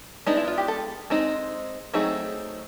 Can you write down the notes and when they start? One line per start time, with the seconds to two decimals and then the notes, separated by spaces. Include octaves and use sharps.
0.26 G#3 B3 D4 D#4
0.37 E4
0.48 F4
0.58 G4
0.68 A4
1.10 G#3 C4 D#4
1.93 F#3 A3 C4 D#4 G#4